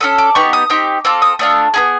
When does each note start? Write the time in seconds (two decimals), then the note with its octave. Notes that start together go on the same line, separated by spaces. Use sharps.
0.01 C#4 E4 A4 D#6
0.18 D6
0.35 B3 D#4 G4 C#6
0.53 D#6
0.70 C4 D#4 G4 D6
1.05 C4 F4 A4 D6
1.22 D#6
1.39 A3 D4 F4 D#6
1.74 B3 E4 G#4